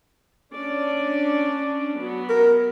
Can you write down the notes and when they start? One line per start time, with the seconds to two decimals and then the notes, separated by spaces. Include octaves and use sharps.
0.53 C#4 D4 D5
1.99 F#3 B3
2.29 A#4